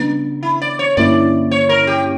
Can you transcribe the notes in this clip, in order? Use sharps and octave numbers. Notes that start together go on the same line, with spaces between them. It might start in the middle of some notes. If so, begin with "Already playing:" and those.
Already playing: C#3 G3 B3 D4
E4
D5
C#5
G2 D3 A#3 C#4 E4 D5
C#5
A#4
G4